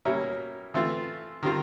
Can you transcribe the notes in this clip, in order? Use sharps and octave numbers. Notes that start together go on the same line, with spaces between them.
B2 G3 A#3 C#4 E4
E3 A3 C4 F4
D#3 G3 C4 F4 A#4